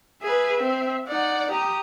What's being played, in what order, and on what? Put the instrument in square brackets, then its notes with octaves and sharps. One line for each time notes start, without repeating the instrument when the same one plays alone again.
[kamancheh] G#4 B4 [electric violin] E5
[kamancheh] C4
[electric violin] D#4 F#5 [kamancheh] D5
[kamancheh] G4 [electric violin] A#5 D#6